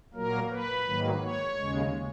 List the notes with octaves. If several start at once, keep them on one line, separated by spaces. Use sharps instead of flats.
A#2 F#3 A#3 A#4
B4
G#2 D#3 F#3 A#3
C#5
D#2 C#3 G#3